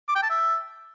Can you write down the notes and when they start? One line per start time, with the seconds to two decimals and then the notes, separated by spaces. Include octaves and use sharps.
0.08 D6
0.15 G5
0.23 A5
0.30 E5